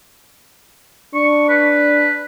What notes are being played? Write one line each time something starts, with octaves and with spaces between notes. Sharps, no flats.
D4 C#6
B4